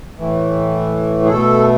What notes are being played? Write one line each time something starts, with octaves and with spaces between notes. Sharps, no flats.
A2 E3 A3
G#4
B2 A3 A4